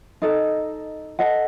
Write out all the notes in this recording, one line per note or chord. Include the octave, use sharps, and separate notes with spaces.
D#4 A4 D#5
A4 D#5 F#5 A5